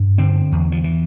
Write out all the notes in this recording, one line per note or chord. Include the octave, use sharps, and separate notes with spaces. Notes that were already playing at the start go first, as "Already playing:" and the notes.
Already playing: G2
D3 C4
E2
F3
E3